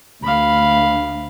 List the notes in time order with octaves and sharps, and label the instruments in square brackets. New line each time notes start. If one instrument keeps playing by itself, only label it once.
[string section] D2 [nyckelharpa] F5 B5